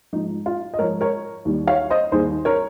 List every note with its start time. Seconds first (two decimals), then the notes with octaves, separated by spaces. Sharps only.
0.13 G#2 F3 D#4
0.46 F4
0.74 D#5
0.79 G#2 F3 A#4 C#5
1.01 A#4 C#5
1.45 D#2 D#3 G3
1.67 C#5 F5
1.90 C5 D#5
2.12 D#2 D#3 G3 G#4 C5
2.45 A#4 C#5